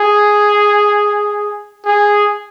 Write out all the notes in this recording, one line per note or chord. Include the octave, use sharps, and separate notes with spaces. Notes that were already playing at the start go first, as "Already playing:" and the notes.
Already playing: G#4
G#4